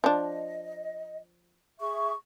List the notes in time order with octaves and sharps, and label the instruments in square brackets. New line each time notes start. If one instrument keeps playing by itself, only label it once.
[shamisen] F3 D4 [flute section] D#5
[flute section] G#4 E5 C#6